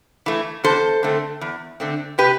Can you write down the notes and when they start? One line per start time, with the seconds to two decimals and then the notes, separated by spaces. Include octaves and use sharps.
0.26 E3 A3
0.64 E2 A4 C5
1.03 D3 A3 C4
1.41 E2
1.80 D3 A3 C4
2.18 C3 G4 B4